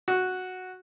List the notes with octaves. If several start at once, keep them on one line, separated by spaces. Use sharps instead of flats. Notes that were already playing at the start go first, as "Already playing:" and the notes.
F#4